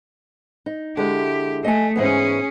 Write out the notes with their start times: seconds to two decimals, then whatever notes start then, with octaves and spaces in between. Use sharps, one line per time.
0.66 D#4
0.97 D3 G#3 E4 G4
1.64 A3 D#5 G#5
1.96 G#2 E3 B3 C#4 G#4